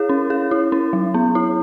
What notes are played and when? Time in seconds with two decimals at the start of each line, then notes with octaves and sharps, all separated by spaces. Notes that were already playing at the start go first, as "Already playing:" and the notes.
Already playing: E4 G#4 C#5
0.09 C#4
0.30 G#4
0.51 E4
0.72 C#4
0.93 F#3
1.14 B3
1.35 E4